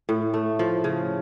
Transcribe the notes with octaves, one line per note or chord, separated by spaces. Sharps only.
A2
A3
F3
C#3